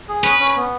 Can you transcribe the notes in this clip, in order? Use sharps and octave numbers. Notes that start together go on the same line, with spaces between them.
G#4
C#4 B4
C#4
B3